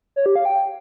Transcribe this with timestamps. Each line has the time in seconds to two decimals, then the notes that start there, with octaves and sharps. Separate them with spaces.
0.16 C#5
0.26 G4
0.36 F5
0.45 G5